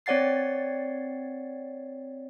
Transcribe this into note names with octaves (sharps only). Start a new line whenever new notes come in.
C4 C#5 D5 F#5 A6 C7